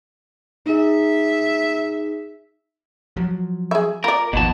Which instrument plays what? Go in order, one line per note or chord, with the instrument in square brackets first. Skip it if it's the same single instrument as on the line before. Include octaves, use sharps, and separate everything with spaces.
[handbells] D#4 G#4 [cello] E5
[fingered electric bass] F3 F#3
[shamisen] G#4 E5
[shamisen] F4 D5 [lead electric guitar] A#4
[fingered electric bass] G#1 D#2 F3 [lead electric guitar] B2 A5